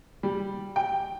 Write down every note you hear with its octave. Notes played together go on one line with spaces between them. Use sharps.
G3
G5